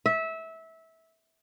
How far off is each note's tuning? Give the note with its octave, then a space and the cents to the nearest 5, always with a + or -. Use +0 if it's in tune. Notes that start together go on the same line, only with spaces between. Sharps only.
E5 -20